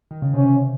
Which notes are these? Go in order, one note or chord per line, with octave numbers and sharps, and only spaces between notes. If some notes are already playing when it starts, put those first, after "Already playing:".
D#3
C#3
C3 C#4